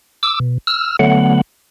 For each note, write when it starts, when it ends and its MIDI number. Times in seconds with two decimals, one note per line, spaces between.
0.23 0.39 86
0.23 0.39 88
0.40 0.58 47
0.67 0.97 88
0.67 0.97 89
0.99 1.41 50
0.99 1.41 54
0.99 1.41 57
0.99 1.41 59
0.99 1.41 78